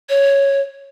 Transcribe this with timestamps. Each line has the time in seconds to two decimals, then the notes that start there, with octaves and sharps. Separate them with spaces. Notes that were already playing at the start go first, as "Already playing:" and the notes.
0.09 C#5